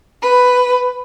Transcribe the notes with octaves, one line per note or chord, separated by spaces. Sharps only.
B4